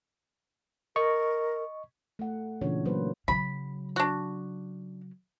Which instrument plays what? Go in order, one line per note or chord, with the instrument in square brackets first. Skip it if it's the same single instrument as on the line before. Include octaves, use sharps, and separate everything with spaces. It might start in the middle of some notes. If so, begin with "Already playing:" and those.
[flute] A#4 [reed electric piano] D#5 C#6
[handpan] A3 F#5
A#2 C#3 E3 C#4 D4 C#5
F#3 A#3 B4 C5
[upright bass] C#3 F#3 [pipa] B5
[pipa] D4 F#4